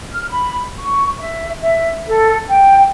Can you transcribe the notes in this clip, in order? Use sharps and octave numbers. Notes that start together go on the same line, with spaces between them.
F6
B5
C#6
E5
E5
A4
G5